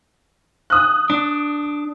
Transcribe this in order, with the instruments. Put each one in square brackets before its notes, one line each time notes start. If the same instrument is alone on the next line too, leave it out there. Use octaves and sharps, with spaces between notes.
[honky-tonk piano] D#6 F#6
[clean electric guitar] D4